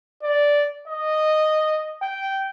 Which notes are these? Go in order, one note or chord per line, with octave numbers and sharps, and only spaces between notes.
D5
D#5
G5